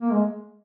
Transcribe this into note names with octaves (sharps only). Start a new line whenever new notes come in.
A#3
G#3